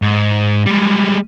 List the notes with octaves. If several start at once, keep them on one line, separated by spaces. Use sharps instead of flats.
G#2
G3 G#3